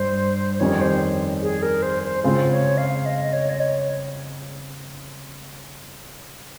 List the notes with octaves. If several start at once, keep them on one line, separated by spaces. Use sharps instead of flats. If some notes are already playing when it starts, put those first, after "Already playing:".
Already playing: G2 G3 C5
F2 D#3 G3 C#4 G4 C#5
C5
G#4
A#4
C5
C5
C#3 G#3 C4 F4 G#4 C5
C#5
F5
D#5
C#5
D#5
C#5